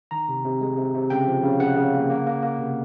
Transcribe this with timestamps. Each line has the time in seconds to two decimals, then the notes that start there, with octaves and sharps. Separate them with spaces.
0.11 D#3 A#5
0.29 C3
0.45 C3
0.61 G#3
0.78 C3
0.94 C3
1.10 C#3 G5
1.27 F3
1.44 C#3
1.60 C#3 F#5
1.77 C#3
1.94 A#3
2.10 A#3
2.27 A#3
2.43 A#3
2.59 C3